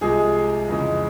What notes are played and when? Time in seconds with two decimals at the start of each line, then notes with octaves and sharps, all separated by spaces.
0.01 C2 C3 F3 G#3 G#4
0.68 F2 C#3 E3 G#3